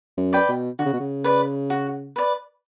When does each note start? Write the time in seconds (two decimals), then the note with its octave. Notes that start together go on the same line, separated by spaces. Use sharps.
0.18 F#2
0.33 B4 D5 G5
0.49 B2
0.79 D3 F#4
0.85 C#3
0.93 B2
1.00 C#3
1.24 B4 D5
1.70 F#4
2.16 B4 D5